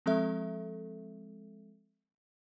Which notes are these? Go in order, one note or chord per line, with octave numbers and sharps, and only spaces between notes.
F3 G#3 C4 A4 E5